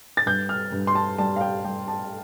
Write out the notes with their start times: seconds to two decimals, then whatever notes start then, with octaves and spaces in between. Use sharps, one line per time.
0.17 A6
0.26 G2 G6
0.49 F6
0.72 G2
0.87 C6
0.95 A5
1.18 G3 A5
1.36 F5
1.41 G5
1.64 G3 G5
1.88 A5